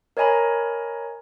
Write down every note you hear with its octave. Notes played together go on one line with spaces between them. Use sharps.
A#4 C#5 D#5 G#5 A#5 B5